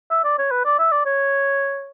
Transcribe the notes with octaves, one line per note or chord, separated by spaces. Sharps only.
E5
D5
C#5
B4
D5
E5
D5
C#5